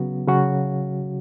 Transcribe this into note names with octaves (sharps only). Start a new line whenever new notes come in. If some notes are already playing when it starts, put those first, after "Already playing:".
Already playing: C#3 F#3 B3 F#4
C#3 F#3 C#4 F#4